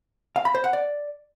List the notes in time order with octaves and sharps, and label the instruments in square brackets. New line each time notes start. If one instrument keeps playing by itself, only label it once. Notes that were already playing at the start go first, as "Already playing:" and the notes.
[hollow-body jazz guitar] F5
B5
C5
F#5
D5